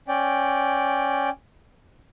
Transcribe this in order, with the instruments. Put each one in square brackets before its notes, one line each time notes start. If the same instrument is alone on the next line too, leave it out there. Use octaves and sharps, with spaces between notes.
[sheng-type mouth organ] C#4 D5 G5